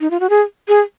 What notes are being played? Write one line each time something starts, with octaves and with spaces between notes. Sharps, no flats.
D#4
F4
F#4
G#4
G#4